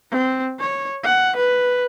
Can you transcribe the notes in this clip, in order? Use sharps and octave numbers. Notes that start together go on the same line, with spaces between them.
C4
C#5
F#5
B4